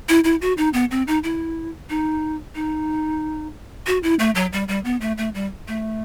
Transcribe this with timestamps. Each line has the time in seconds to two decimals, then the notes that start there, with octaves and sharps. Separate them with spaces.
0.09 E4
0.24 E4
0.42 F#4
0.57 D#4
0.73 B3
0.91 C4
1.08 D#4
1.24 E4
1.90 D#4
2.55 D#4
3.87 F#4
4.03 E4
4.19 A3
4.35 F#3
4.53 G3
4.68 G3
4.85 B3
5.01 A3
5.18 A3
5.35 G3
5.68 A3